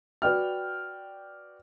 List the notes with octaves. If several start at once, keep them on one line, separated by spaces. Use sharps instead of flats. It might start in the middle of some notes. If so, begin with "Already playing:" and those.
F#4 B4 D5 G5 F6